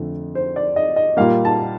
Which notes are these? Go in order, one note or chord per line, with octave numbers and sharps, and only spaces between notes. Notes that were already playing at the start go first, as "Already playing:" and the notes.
Already playing: F2 D3 A3
C5
D5
D#5
D#5
A#2 G3 A#3 F5
A5